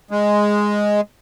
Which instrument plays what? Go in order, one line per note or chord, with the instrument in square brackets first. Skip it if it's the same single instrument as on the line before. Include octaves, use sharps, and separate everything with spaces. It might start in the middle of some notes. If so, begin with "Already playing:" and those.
[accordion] G#3